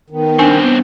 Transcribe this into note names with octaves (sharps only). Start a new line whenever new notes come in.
D#3 B3 D#4
G2 B3 C4 D4 G#5